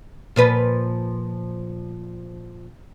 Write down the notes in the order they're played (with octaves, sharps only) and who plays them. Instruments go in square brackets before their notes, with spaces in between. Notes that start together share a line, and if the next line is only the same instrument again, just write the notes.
[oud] A#2 F3 B4